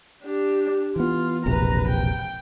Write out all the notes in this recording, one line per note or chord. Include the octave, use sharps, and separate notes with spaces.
D4 G4
E3 B3 F4
E1 A#1 C3 B4 A#5
G5